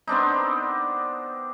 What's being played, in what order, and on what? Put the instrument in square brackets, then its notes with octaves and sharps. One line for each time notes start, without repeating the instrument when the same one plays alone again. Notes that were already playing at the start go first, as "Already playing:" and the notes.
[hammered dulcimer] B3 C4 D4 D#4